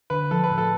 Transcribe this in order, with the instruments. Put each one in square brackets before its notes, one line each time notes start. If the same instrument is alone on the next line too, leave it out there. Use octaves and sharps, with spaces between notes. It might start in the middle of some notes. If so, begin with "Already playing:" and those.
[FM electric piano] D3 [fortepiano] B4
[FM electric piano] F3 [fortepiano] A4
[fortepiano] B4
[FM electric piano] A2
[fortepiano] A4